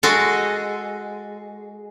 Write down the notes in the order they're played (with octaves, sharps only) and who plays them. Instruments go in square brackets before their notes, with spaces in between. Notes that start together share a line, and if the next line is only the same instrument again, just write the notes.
[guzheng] G#3 F#4 A4